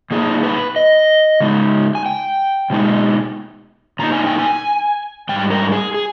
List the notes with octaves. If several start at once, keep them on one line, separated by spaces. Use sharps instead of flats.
A#2 A#3 D#4 G#4
B4
D#5
C#3 G#3 D#4
G#5
G5
B2 G#3 D#4
A#2 A#3 D#4 A#5
G#5
G5
G#5
G#2 G3 G5
A#4
G#4
G#4